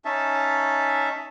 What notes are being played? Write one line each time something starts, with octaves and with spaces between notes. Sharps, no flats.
C#4 D#4 E5 A5